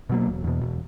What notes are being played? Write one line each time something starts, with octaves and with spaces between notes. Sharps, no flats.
B2 F#3 A#3
E1
E2 B2
E1